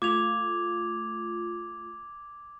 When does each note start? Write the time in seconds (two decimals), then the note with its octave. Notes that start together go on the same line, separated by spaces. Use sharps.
0.02 A3 F4 D6 G#6 F7